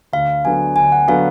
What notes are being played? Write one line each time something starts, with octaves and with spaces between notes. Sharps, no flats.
D2 F5
D3 F#3 B3 G#5
D2 G#5
F#5
D3 F#3 B3 F5